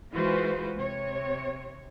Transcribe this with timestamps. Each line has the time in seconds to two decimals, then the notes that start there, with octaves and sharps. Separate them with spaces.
0.12 E3 G#3 F4 F#4 B4 C5
0.73 C3 C#5